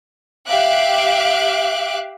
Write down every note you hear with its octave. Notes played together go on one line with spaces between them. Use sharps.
G4 E5 F5 D6 F#6